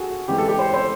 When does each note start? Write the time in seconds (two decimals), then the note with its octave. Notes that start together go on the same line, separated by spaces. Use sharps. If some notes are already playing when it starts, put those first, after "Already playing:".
Already playing: F#4 G#4 A4
0.28 C#3 E3 G#3 C4 G4
0.38 A4
0.48 G4
0.59 C5
0.73 C5